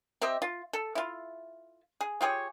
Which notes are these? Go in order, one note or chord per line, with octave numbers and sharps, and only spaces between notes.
C4 G4 D#5 E5
F4
A4
E4 F4
G#4
F4 G4 G#4 C#5